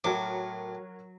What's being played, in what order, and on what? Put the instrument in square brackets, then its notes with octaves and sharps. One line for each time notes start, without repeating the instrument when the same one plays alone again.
[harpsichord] A2 D6 [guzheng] F#3 [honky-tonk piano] F#4 A#4 C#5